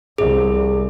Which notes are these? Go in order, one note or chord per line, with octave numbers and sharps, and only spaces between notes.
C2 G#4